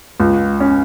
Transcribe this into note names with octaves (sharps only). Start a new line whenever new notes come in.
C#2
C#4